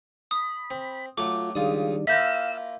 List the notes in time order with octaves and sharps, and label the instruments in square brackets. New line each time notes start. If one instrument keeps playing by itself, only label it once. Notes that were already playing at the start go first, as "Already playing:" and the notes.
[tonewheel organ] B5 [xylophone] D#6
[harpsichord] C4
[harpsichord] F#3 A3 [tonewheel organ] F4 [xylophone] D6
[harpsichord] C#2 F4 D#6 [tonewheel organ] D#3 G3 D4
[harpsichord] A#3 E4 F4 [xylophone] E5 G6 A#6 [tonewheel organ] F5 E6